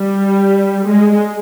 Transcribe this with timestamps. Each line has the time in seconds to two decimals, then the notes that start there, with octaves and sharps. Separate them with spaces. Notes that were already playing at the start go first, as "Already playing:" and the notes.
Already playing: G3
0.86 G#3